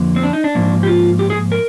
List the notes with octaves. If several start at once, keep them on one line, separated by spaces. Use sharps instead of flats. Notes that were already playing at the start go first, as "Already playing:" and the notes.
Already playing: F2 D3 F3 A#3
C4
D4
D#4
D4
G#2 F3 A#3
G4
F4
G4
G#4
A#4